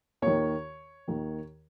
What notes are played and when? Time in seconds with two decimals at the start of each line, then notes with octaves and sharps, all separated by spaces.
0.22 D#2 D#3 C#5
1.07 D#2 D#3